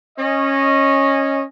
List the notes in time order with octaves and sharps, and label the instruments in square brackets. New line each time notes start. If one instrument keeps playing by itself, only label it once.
[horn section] C#4 D#5